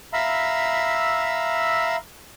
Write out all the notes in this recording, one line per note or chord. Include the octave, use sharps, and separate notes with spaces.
E5 F5 A#5 B5 E6